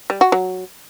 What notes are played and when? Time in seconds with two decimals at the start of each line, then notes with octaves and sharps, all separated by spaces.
0.10 G3
0.21 F#4
0.32 F#3